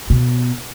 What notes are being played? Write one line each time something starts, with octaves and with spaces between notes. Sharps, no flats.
B2